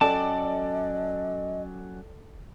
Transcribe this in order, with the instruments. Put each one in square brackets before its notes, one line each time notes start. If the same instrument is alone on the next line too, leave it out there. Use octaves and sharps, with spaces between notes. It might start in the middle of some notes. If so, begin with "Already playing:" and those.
[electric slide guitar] F#3 C#4 G5 [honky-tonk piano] A4 D5 D6 [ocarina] D#5 [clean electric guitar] A5